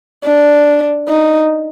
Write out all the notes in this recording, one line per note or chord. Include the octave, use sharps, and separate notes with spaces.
D4
D#4